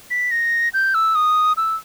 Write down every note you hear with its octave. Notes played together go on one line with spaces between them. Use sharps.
B6
A#6
G6
E6
D#6
E6